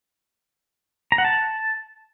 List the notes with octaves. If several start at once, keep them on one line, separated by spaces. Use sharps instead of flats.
A#5
F#5
A5